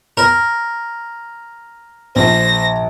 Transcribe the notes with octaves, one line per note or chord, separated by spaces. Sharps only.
A#4
A#1 C5 A#6